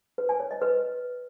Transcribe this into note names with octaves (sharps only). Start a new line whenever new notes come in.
B4
G#5
C#5
D#5
B4